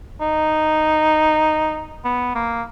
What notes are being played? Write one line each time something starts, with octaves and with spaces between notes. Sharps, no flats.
D#4
B3
A#3